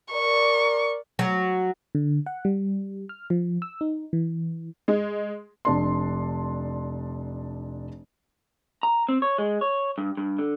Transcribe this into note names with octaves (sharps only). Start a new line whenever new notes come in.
A#4 D5 C#6
F#3
D3
F#5
G3
F6
F3
E6
D#4
E3
G#3
F1 D4 C6
A#5
C4
C#5
G#3
C#5
G2
G2
D3